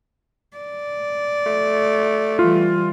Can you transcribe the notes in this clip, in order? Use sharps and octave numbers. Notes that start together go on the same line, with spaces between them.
D5
A3
E3 G3 F4